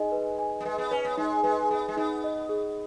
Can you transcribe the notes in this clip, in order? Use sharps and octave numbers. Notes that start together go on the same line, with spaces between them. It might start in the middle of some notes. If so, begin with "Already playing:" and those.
Already playing: G#3 D#4 D#5
B4
G#5
B3
G#3 B4
B3
C#4 B4
B3
G#3 D#4
G#3 B4
B3 G#4
G#3
B3 D#4
D#5
G#4